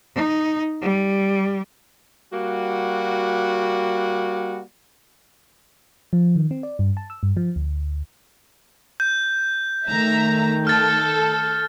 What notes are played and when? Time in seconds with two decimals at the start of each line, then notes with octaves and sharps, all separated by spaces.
0.15 D#4
0.82 G3
2.32 G3 A#3 F#4
6.13 F3
6.36 D#3
6.51 C4
6.63 D5
6.79 G2
6.97 A5
7.10 E6
7.23 G2
7.37 F3
7.56 D2
9.00 G6
9.88 D#3 A3 E5 A#5
10.67 A4 F6 A6